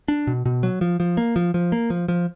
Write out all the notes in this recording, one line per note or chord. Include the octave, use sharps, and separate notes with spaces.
D4
B2
B2
F#3
F3
F3
A#3
F3
F3
A#3
F3
F3